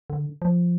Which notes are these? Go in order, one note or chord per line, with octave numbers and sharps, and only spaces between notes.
D3
F3